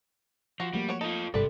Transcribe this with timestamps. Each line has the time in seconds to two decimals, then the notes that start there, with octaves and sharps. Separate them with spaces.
0.60 F3 F#4
0.73 F3 G3 A3 A#3
0.89 F#4 C#5
1.01 D#4 F4 A4
1.34 G#1 G2 C3 G3 A4 B4 D5